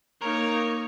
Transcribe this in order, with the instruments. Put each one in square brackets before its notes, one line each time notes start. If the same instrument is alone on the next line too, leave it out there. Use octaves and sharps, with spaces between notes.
[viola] A#3 [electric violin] D#4 C#5 [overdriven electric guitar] A#4